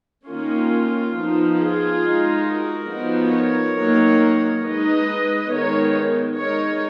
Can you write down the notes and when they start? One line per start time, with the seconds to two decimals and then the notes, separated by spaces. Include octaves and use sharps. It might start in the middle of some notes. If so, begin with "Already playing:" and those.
0.26 D#3 A#3 C#4 F4
1.13 F3 B3 D#4
1.58 F4 G#4
2.01 G#3 D#4
2.44 F#4 A#4
2.88 F3 B3 D#4
3.32 A#4 C#5
3.76 D#3 F#3 A#3 D#4
4.63 G#3 D#4 B4 D#5
5.50 D#3 G#3 B3 D#4 A#4 C#5
6.38 G#3 D#4 A#4 C#5